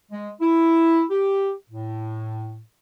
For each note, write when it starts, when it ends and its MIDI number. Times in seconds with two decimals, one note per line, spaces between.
0.12 0.32 56
0.41 1.04 64
1.11 1.53 67
1.70 2.60 45